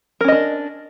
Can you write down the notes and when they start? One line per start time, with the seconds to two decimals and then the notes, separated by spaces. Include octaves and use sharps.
0.21 A#4
0.24 C#4
0.28 D#5
0.32 D4